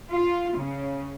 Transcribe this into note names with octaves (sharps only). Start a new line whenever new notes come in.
F4
C#3